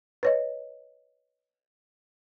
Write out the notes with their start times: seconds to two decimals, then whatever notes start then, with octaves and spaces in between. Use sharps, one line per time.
0.23 B4 C#5 D#5